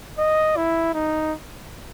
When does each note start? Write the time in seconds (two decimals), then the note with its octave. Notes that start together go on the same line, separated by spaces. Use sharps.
0.19 D#5
0.57 E4
0.94 D#4